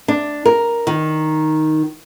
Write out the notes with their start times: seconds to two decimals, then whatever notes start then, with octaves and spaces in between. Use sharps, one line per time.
0.08 D4
0.45 A#4
0.87 D#3